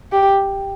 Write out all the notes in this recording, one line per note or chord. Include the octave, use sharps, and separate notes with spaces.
G4